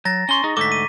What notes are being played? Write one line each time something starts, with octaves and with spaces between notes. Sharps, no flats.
F#3 A#5 A6 A#6
C#4 C6 C#6 G7
D#4 G#4
D2 G#2 A4 D6 B6
D#7